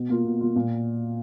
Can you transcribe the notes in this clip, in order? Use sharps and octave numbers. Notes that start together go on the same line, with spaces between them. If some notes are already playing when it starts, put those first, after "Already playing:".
Already playing: B2
A#3 F4
B2
A#3 F4
A#2